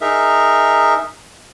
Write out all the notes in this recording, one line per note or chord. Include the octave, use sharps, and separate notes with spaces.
D#4 G#4 A#4 E5